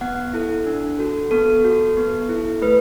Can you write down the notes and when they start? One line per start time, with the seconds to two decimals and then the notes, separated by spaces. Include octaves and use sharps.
0.01 B3 F#5
0.33 E4 A4
0.66 D4
0.99 F#4 A4
1.31 B3 A4
1.64 F#4 A4
1.97 B3
2.29 E4 A4
2.62 A3 B4